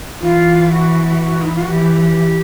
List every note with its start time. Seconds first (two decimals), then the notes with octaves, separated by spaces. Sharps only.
0.20 E3 F4
0.70 F#4
1.20 F#4
1.41 D#4
1.48 E4
1.55 F4
1.61 F#4
1.69 E3 G4